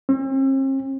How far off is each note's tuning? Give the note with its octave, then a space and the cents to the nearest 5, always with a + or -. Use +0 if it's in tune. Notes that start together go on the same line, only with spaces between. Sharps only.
C4 +45